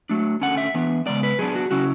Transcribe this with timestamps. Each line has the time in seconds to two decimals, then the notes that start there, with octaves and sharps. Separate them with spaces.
0.09 F#3 A3 D4
0.41 D3 A3 C#4 F#5
0.57 E5
0.74 E3 B3 D4
1.06 C#3 G#3 B3 D5
1.23 B4
1.39 F#3 B3 D4 G#4
1.55 F#4
1.71 C#3 F#3 C#4 E4 F#4